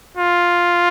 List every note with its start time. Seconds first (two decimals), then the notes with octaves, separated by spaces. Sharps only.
0.17 F4